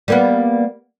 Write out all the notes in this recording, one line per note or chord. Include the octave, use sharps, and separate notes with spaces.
G3 A#3 B3